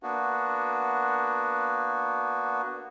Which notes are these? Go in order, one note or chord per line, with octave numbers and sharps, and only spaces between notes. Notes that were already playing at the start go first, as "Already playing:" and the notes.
A#3 B3 D4 F#4